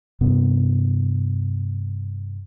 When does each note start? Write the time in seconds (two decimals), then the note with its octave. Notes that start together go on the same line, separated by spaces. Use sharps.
0.21 G2 C3 B3